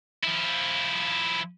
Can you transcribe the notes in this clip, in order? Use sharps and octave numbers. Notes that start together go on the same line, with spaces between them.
F3 E4